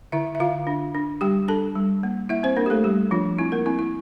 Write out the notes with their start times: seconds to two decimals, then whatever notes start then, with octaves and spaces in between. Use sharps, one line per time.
0.12 D3 E4 E5
0.35 E5
0.40 D3 F4 F5
0.67 D4
0.95 D4
1.21 G3 G4 G5
1.48 D4 A4 A5
1.75 G3
2.03 A#3
2.29 A#3 E4 E5
2.43 C4 C5
2.57 A#3 D4 A#4
2.66 G4
2.70 A3 A4
2.84 G3 G4
3.11 F3 D4 F4
3.39 C4 E4
3.52 A#3 A#4
3.66 C4 E4
3.79 E4